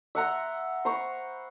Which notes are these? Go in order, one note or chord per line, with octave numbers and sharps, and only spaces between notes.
E5 F#5 A#5 C6
C5 A#5 B5 C#6